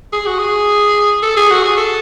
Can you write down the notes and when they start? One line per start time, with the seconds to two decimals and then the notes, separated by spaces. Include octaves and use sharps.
0.13 G#4
0.26 F#4
0.39 G#4
1.23 A4
1.36 G#4
1.50 F#4
1.63 G#4
1.78 A4